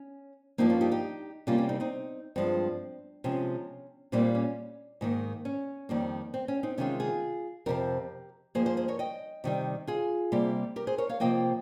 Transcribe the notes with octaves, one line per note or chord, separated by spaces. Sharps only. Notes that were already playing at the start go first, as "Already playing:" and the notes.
Already playing: C#4
G2 F3 A#3 C4 D#4
C#4 F4
D#4 G4
D#4 G4
C3 G3 A#3 C#4 F4
C#4
C4 D#4
C4 D#4
G2 F3 G#3 C4
C3 F3 G#3 C#4
A#2 G3 A#3 C4 D#4
C#4
G#2 D#3 A#3
C#4
F2 D#3 G3 A#3
C4
C#4
C4 D#4
C3 D#3 G#3 C#4 F4
F4 G#4
F2 C3 F3 G4 A#4
G2 F3 A#3 G#4 C5
G#4 C5
G#4 C5
A#4 C#5
D#5 G5
C3 D#3 G3
F4 G#4
C3 G3 A#3
G4 A#4
G#4 C5
A#4 C#5
C#5 F5
C3 F3 A#3 D#5 G5